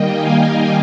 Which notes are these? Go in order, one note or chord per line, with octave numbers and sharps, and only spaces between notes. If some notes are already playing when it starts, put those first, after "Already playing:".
Already playing: D#3 G3 A#3 D#5 G5
F5 G#5